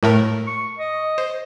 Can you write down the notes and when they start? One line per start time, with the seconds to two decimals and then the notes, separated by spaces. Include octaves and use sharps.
0.03 A2 A3 A#4
0.47 C#6
0.79 D#5
1.18 C5